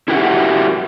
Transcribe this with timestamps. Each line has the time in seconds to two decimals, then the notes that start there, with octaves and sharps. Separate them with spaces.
0.08 E4 F#4 G4 A#4 E5 F#5